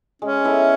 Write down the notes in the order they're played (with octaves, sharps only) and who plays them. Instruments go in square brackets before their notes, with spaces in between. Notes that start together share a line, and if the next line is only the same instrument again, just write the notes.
[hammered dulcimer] G#3 [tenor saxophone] C#4
[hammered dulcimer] B3 E4 A4